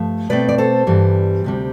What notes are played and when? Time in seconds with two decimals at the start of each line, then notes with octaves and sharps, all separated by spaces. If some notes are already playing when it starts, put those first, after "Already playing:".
Already playing: G2 F3 A3
0.29 B2 A3 C4 B4 D5
0.49 D5
0.58 A4 C5
0.87 G2 E3 G3 B3
1.44 D2 C3 G3